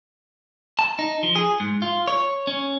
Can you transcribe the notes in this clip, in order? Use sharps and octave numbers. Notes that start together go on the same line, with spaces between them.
A5
D#4
F3
G#4
G#2
F4
C#5
C#4